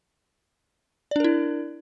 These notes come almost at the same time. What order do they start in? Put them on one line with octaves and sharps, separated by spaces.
D5 D4 A#4 E4